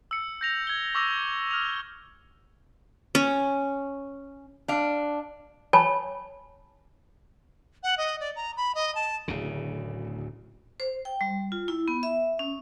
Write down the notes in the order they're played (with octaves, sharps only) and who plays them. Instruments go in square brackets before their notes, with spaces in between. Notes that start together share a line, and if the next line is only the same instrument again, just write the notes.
[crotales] E6 C#7
G6 A#6 F7
G#6 G7
C#6 D6 E6 A#6 F7
F6 F7
[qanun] C#4
[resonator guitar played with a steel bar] D4 F5
[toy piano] C#5 G#5 A5 B5
[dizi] F#5
D#5
D5
A#5
B5
D#5
A5
[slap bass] D1 D2 C#3
[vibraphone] C5
G5
G3
F4
E4
B3
E5
C#4